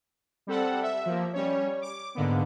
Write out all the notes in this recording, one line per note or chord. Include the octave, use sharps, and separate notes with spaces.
G3 C4 A4 F#5
E5
F3 A#3
G3 C#4 C#5
D6
G#2 D3 A#3 B3